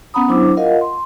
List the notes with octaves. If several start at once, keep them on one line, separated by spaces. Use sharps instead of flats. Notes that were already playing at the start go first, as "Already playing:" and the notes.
B3 C#4 F#5 A#5 B5 D#6
F#3 D4 E4 C5 D6 E6
F4 A#4 D#5 F5 F#5
C6